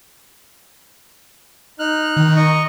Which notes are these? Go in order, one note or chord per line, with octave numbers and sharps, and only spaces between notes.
D#4 F6 F#6
D#3
D#5 A#5 C#6